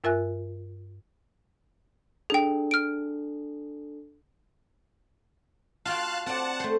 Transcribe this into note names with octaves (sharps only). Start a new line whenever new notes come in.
G2 F4 A#4 E5 G#5 F#6
D4 G#4 A4 G5
F6 D7
F4 F#4 F5 G5 A5 F#6
C4 D5 F#5 A5
A3 C5